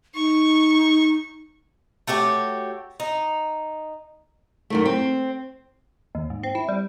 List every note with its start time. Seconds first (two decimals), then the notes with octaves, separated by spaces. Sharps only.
0.15 D#4 C#6
2.07 A3 F#4 G4 C#5
3.00 D#4
4.70 F#2 D#3 A3
4.85 C4
6.15 D#2
6.30 G#2
6.43 C4
6.55 E4
6.69 G3